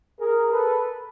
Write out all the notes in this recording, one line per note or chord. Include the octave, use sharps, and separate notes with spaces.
G#4 A#4
A4 B4